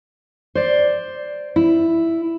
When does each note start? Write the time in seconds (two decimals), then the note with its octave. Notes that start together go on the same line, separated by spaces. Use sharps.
0.55 C5 D5
1.56 E4